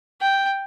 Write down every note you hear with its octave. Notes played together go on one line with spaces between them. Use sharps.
G5